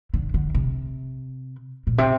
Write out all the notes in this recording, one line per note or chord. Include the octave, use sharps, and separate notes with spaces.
D3
D3
C3
A#2
C3